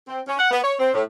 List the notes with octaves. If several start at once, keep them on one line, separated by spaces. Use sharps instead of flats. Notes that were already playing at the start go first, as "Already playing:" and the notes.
C4
C#4
F#5
B3
C#5
C4
A2